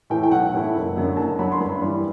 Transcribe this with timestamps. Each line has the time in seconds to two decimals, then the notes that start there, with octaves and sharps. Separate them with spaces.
0.10 A2 E3 A3 E4 G5
0.23 G5
0.31 B1 F#5
0.54 A2 E3 A3 E4
0.75 F#1
0.96 F#2 D3 F#3
1.17 F#1 A5
1.39 F#2 D3 F#3 B5
1.52 C6
1.60 G2 B5
1.82 E3 G3